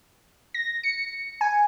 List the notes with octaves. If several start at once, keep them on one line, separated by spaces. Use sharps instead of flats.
A#6
C#7
G#5